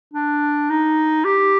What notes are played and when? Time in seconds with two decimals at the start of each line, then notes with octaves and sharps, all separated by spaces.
0.14 D4
0.70 D#4
1.25 G4